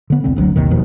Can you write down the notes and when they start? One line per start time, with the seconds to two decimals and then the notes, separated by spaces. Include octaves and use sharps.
0.10 D3 B3
0.24 E1 C2 D3 C4
0.36 F#1 D2 A#2 F#3
0.56 A#1 D#2 C3 D#3
0.70 F#1 D#2 B2 F3